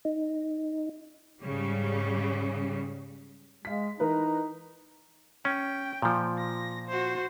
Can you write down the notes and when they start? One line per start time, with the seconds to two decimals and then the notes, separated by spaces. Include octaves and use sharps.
0.05 D#4
1.42 G#2 C#3 G3
3.65 G#3 F5 B6
4.00 E3 D#4 A#4 B4
5.45 C#4 G5
6.02 A#2 F3
6.39 A#6
6.88 F#4 C5